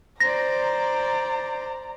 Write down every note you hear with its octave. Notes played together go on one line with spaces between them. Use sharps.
C5 D5 A#5 A#6